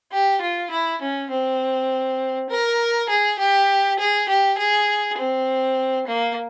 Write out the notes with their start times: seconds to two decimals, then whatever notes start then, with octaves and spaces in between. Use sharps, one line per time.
0.12 G4
0.41 F4
0.71 E4
1.02 C#4
1.31 C4
2.50 A#4
3.09 G#4
3.39 G4
3.99 G#4
4.29 G4
4.58 G#4
5.18 C4
6.07 A#3